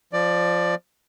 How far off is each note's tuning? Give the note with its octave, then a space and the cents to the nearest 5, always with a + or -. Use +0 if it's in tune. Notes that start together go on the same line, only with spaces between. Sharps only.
F3 +0 D5 +15